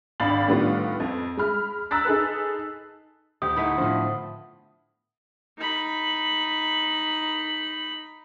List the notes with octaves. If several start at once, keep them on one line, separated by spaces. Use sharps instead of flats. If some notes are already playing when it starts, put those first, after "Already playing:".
G#1 D4 F5 B5 A6 F#7
A2 D#3 G3 B3 D4 F4
F2
G#3 B5 F6
A#5 E6 F#6 A6 B6
D#4 G#4 A4 B4
D2 G4 D#6
A3 B3 D#4 E4
A2 D3 F3
D#4 B5